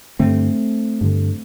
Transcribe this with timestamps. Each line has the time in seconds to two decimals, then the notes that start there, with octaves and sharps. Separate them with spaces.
0.19 G2 D3 A3 C4
1.01 G2 D3